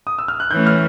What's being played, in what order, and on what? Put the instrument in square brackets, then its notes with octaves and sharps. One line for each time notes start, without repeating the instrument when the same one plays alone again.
[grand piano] D#6
E6
F6
F#6
[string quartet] E3 A3 C#4 [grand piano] G6
[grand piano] F6